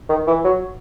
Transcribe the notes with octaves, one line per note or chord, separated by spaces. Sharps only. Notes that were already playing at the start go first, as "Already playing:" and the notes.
D#3
E3
F#3